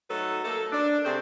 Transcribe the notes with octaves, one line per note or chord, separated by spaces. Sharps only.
F#3 A3 D#4 A4 B4
A3 A#3 A4
D4
C3 A3 C4 G#4 C5